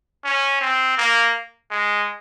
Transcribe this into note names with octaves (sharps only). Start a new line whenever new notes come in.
C#4
C4
A#3
G#3